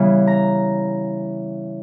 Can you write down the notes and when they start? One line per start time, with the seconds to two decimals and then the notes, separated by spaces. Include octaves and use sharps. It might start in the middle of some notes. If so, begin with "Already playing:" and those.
Already playing: C#3 E3 G3 B3
0.27 A#5